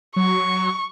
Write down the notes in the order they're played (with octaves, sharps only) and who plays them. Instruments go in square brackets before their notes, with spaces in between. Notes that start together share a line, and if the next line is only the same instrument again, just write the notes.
[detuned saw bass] F#3 [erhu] C#6